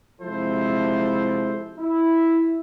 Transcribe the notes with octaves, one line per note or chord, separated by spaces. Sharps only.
C3 F3 G#3 E4 A4 C5
E4